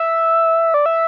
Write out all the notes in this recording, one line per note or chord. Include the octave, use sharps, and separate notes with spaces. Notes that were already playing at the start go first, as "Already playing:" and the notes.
Already playing: E5
D5
E5